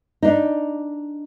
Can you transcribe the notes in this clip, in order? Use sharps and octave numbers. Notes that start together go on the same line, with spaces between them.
D4 D#4